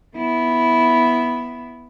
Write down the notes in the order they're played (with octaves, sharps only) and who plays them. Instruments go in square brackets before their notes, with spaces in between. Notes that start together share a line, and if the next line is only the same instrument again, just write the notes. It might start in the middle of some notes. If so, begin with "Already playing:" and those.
[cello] B3 E4